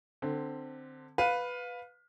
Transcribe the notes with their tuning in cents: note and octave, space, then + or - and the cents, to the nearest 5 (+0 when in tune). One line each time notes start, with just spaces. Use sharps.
D3 +20 C4 +0
B4 +0 F5 +20